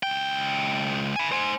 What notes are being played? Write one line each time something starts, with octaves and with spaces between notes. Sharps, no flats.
C#2 G5
G#5 B5
C5 G#5